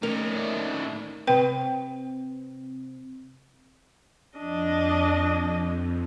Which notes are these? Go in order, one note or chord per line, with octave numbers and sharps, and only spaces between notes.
D#3 A3 A#3 C#4 D#4 A#4
A2 D5 E5
C3 C4 B4 G5
F2 D4 D#5